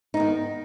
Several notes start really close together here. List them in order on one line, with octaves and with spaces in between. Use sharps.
D#4 B3 D#3